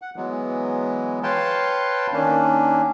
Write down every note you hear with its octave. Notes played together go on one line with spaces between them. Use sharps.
F#5
E3 F#3 G#3 B3
B4 C#5 F5 G5 A5 C6
D#3 A#3 C#4 D4